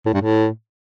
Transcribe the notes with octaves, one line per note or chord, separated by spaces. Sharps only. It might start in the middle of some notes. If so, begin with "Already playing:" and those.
A2
G2
A2